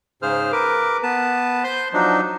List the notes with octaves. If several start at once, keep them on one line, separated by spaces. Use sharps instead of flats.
G#2 C#3 G#4 C5 F6
A#4 B4 D6
B3 B4 A5
C5 C6 G6
F3 F#3 D4 D#4